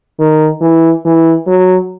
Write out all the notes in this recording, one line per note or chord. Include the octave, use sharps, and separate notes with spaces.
D#3
E3
E3
F#3